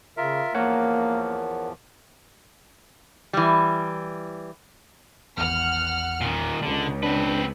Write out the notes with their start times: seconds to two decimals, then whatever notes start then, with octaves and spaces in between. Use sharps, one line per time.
0.17 C#3 F4 A#4 E5
0.55 E2 F3 A#3 A#4 C#5 F#5
3.33 E3 G3
5.37 G#1 E2 F#5 F6
6.21 A#2 D#3
6.62 C#2 D3
7.03 C4 D4 B4